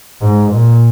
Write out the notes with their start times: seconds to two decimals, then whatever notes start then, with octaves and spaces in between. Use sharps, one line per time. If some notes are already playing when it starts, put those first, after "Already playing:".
0.21 G#2
0.51 A#2